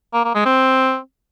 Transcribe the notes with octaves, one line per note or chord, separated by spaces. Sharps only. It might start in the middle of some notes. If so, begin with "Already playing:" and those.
A#3
A#3
G#3
C4